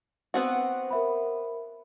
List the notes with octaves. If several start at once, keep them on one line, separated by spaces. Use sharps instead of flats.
B3 C4 F#4
A#4 E5 B5